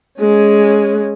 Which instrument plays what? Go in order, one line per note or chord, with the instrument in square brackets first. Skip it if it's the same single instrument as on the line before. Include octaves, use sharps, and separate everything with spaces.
[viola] G#3 C#4